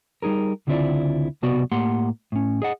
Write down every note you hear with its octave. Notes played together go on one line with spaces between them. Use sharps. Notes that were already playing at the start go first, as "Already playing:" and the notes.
G3 D#4 G#4 A#4
C#2 D3 C4 E4 F4 D5
B1 C3 B3 F#4 D5
A2 A#3 G4 F#5 C6
A2 C#4
G#4 D#5 F#5